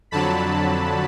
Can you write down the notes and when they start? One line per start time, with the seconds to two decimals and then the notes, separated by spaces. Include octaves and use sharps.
0.11 F2 D3 F#3 A5 B5